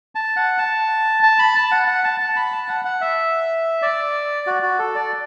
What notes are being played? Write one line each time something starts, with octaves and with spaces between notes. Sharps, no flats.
A5
F#5
A5
A5
B5
A5
F#5
F#5
A5
A5
B5
A5
F#5
F#5
E5
D5
F#4
F#4
A4
D5